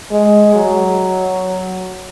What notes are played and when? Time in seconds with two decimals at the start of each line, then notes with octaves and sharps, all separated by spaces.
0.11 G#3
0.55 F#3